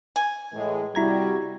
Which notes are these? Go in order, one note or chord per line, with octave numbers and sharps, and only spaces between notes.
G#5
A2 E3 G#3
C3 G3 E4 F#4 A#5 G#6